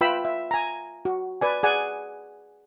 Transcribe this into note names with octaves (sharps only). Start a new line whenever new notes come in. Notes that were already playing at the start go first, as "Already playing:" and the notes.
F4 B4 E5 G5 B5 E6
E5
G#5 A#5
F#4
B4 D5 G#5
G#4 D5 F#5 G#5